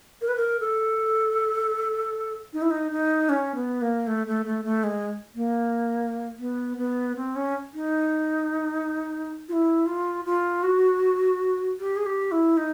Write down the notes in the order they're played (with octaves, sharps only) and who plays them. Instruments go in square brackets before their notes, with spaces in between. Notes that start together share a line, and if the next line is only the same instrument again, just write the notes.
[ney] A#4
B4
A#4
A4
D#4
E4
D#4
D#4
C#4
B3
A#3
A3
A3
A3
A3
G#3
A#3
B3
B3
C4
C#4
D#4
F4
E4
F4
F4
F#4
G4
G#4
G4
E4
D#4